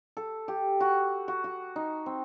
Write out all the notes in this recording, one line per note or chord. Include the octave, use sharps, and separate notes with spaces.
A4
G4
F#4
F#4
F#4
D#4
C4